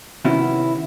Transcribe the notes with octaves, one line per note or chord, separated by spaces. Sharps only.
C3 D#3 B3 C#4 E4 F#4